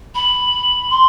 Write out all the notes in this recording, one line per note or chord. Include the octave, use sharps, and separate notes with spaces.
B5
C6